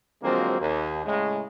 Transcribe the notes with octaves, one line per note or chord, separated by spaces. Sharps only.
D3 F3 F#3 G#3 A#3 C4
D#2
A2 C#3 G#3